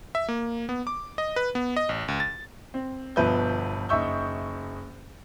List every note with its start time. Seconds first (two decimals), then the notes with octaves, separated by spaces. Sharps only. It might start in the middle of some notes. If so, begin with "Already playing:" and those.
0.15 E5
0.29 A#3
0.69 B3
0.87 D6
1.18 D#5
1.36 B4
1.55 B3
1.76 D#5
1.89 A1
2.08 C#2
2.20 A6
2.74 C4
3.16 G1 B2 F3 B4 E5 G6
3.89 F#1 D#4 E5 C#6 E6 G6